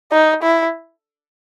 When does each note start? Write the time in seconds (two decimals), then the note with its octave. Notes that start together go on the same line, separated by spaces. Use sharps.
0.12 D#4
0.43 E4